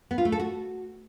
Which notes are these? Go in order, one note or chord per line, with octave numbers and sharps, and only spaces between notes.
B3
F4
A3
A4
F#4